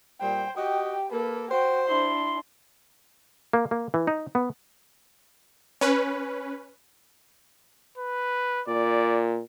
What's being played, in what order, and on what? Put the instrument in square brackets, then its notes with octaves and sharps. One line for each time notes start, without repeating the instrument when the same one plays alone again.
[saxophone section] A#2 G3 [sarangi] C5 [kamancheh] G5
[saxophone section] F#4 D#5 [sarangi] G4 [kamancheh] G5
[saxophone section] A#3 [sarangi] A4 [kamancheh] B4
[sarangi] F#4 [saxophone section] C5 [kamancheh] G5
[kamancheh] D4 E4 [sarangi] C6
[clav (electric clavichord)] A#3
A#3
E3
D#4
B3
[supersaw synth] C#4 B4
[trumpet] B4
[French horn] A#2 [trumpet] D5